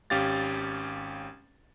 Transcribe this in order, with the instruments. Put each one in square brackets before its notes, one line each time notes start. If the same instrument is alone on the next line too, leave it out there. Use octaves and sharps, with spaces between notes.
[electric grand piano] G#1 C#4 G4 F5 A6